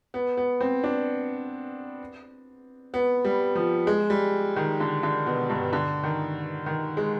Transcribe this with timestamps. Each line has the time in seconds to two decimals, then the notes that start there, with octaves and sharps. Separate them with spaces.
0.14 B3
0.37 B3
0.61 C4
0.84 D4
2.94 B3
3.25 G3
3.55 F3
3.87 G#3
4.10 G3
4.56 D#3
4.80 D3
5.03 D3
5.26 B2
5.49 G2
5.73 D3
6.03 D#3
6.66 D#3
6.97 G#3